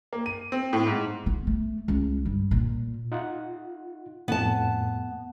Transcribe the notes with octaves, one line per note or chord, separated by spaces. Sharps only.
A#3
D#7
C4
A2
G#2
B3
A3
C#2
G2
A#2
D#4 F4 F#5
F2 A2 B3 A5